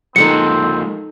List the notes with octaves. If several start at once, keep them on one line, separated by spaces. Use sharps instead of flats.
F3 G#3 A#3 C4 D#4 A4 F#5 C#7